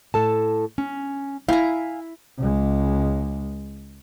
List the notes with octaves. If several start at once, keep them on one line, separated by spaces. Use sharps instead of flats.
A2 A4 A5
C#4
E4 F5 G5 G#5 A#5
C#2 G#3